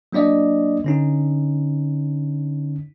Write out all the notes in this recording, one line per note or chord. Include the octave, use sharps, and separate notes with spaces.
F#3 A#3 D4 D5 D#5
D3 C#4 D#4